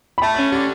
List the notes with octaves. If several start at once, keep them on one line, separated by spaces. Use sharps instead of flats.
B5
A3 A5
C#4
D3 G4